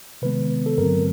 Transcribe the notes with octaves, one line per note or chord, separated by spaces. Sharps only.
C3 D#3 G#3 B3 B4
A4
G2 D3 F#3 A3 C4 A#4